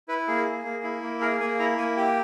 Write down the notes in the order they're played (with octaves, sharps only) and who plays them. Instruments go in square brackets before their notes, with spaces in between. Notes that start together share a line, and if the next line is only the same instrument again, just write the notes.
[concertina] E4 B4
A#3 G#4
G#4
A#3
E4
A#3
G#4 A#4
A#3 G#5
E4 A#5
A#3 G#5
G4 G5